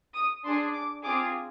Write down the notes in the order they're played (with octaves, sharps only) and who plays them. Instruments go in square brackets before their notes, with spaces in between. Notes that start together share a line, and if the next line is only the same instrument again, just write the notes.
[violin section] D#6
D4 G#4 C6
D6
C4 F4 G#4 D6